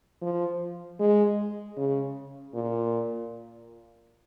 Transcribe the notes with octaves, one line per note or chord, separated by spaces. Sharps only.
F3
G#3
C#3
A#2